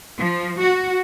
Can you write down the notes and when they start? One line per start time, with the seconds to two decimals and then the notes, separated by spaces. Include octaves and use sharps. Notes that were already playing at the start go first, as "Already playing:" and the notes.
0.17 F3
0.60 F#4